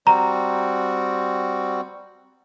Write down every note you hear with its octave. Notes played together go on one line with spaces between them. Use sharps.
G3 C4 F#4 A#5